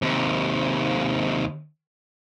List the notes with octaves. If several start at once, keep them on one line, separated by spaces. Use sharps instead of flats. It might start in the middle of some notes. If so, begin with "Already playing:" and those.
D#2 C3